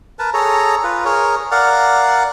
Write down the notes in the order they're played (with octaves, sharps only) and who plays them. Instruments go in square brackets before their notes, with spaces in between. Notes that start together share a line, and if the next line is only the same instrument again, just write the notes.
[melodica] A#4 B4 A5
G#4 A4 C#5 A#5
F4 B4
G#4 A#4 C#5
A#4 D5 F5 F#5